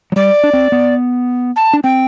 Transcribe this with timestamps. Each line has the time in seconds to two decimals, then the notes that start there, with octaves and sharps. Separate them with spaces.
0.12 F#3
0.16 G3 D5
0.43 D4
0.53 C4
0.72 B3
1.56 A5
1.73 D4
1.84 C4 G5